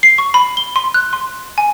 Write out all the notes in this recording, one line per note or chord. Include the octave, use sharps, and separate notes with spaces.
C7
C#6
B5
G7
C6
F#6
C6
G#5